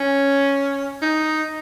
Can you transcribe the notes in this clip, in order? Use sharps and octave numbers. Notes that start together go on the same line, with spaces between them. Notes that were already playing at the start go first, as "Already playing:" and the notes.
Already playing: C#4
D#4